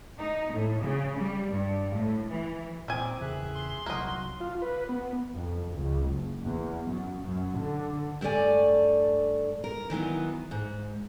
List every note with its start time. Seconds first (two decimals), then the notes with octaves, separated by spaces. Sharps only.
0.19 D#4
0.53 A2
0.82 C#3
1.19 G3
1.52 G2
1.94 A2
2.29 E3
2.88 A#2 D#3 C4 G#5 D6
3.21 E2 C#3 E3 G#4 E5 F#6
3.55 C6
3.86 C2 F#3 A#3 F#4 D#5 F#6
4.40 F4
4.62 B4
4.89 B3
5.34 F2
5.74 C#2
6.10 F#1
6.43 E2
6.90 F#2
7.22 F#2
7.59 D3
8.21 G2 A3 G4 D5 G#5
9.64 A#4
9.90 D#3 E3 F#3 B3
10.51 G#2